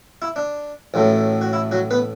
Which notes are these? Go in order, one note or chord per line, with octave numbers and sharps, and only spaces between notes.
E4
D4
A1 A2 F#3 A3
F#4
E4
F#3 F#4
B3 B4